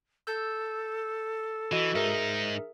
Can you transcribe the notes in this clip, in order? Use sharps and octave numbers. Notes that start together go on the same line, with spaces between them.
A4 E6 G6
E3 F#4 D#5
G#2 D#4 G#4 A#4 E5